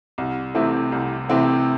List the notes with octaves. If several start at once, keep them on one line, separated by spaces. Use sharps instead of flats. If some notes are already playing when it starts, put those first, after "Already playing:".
C2
C3 E3 A3 C4
C2
C3 E3 A3 C4